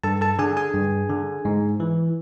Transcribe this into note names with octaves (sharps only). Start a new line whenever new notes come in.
G2 A4 A5
A4 A5
D3 G#4 G#5
G#4 G#5
G2
D3
G#2
E3